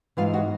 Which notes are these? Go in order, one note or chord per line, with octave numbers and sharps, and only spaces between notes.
G#2 E3 G#3 F4 F5
F#4 F#5